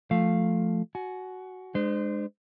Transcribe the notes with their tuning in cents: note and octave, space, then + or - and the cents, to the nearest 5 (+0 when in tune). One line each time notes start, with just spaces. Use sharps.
F3 +0 A3 +0 F5 +0
F#4 +5 G#5 +35
G#3 +0 D4 +40 C5 -25